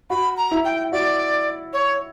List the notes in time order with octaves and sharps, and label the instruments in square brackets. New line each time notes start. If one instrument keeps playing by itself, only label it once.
[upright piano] F#4 [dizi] B5
[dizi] A#5
[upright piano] E4
[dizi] G5
[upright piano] F#4 [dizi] D5
[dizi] C#5